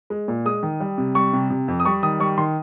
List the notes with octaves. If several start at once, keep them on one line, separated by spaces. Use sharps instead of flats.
G#3
A#2
G#3 D#6
D#3
G3
C3
G3 C#6
C3
C3
F2
D#6
G3 C#6
D#3 D#6
G3 C#6
D#3 C6